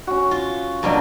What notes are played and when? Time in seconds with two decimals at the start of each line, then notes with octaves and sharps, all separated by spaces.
0.07 C#4 F#4
0.31 F4
0.83 G2 B2 F#3 A#3 F4 D5